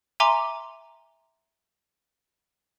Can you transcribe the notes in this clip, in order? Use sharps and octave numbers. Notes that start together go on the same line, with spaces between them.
E5 G#5 A#5 C6 D6